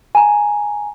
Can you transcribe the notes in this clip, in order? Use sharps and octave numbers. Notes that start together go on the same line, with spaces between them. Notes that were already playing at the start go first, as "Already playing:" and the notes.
G#5 A#5